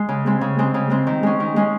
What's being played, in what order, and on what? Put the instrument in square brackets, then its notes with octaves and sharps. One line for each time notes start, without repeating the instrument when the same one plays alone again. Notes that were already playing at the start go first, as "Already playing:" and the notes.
Already playing: [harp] G#3
C#3
G#3 C4
C#3
G#3 C4
C#3
G#3 C4
D#3
G#3 C#4
D#3
G#3 C#4